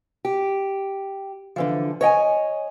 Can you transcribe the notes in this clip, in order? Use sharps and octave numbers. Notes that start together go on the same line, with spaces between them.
G4
D3 E3 F3
C#5 D#5 G5 G#5